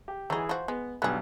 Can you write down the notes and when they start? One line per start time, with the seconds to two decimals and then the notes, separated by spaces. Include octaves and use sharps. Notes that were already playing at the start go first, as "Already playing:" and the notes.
0.08 G4
0.30 E3 F#3 D#4 G#4
0.49 F3 F#4 C5
0.68 G#3 B3
1.02 B1 G2 B3 G#4 F#6